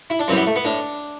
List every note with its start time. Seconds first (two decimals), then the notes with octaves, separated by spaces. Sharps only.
0.10 E4
0.19 D4
0.28 F#2 E3 G3 C4
0.37 B3
0.47 A3
0.56 B3
0.65 A2 D4